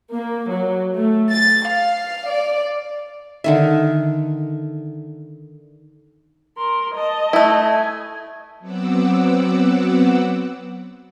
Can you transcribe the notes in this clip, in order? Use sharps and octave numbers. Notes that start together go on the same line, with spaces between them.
A#3
F#3
A3
A6
F5
D5
D3 D#3 E5
A#4 C6
D#5 A5
A3 E4
G#5
F#3 B3 C4 F#5 D6 E6